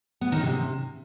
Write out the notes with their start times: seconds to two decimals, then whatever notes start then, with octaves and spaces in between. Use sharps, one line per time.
0.21 B3
0.32 D#3
0.43 C3